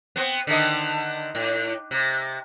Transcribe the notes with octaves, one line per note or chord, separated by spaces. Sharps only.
B3 C4
D3 D#3 D#5
A2
C3